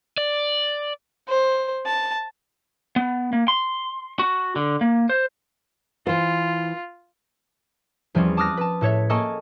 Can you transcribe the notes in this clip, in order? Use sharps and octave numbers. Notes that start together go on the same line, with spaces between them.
D5
C5
A5
B3
A#3
C6
F#4
D3
A#3
C5
E3 F4 C5
E2 F3 G3 C4 C#4
A5 D6 D#6 F6 F#6 A#6
B4 A5
A2 A4 C#5 E5
A#3 A4 D#5 G#5 A5 C#6